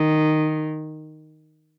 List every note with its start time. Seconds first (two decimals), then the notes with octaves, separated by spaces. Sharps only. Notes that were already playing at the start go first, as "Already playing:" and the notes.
Already playing: D#3